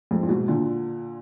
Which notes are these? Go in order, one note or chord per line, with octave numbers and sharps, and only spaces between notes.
F2 G#2
A#2
G#2 B2
A#2 D3